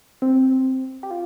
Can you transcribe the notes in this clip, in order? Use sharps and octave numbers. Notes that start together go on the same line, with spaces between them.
C4
G4
F4